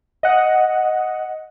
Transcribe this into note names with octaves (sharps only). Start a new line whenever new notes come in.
D#5 F#5